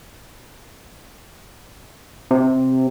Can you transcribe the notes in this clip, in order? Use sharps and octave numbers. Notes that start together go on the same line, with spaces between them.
C3